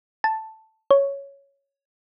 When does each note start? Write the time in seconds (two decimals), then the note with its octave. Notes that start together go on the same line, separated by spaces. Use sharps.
0.24 A5
0.91 C#5